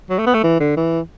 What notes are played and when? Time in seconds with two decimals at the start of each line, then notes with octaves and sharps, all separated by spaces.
0.10 F#3
0.19 A3
0.26 B3
0.34 A3
0.43 E3
0.60 D3
0.77 E3